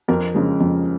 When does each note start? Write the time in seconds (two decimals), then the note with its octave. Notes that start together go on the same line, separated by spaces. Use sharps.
0.08 F2 A#4
0.34 C#3 F3 G#3
0.60 F2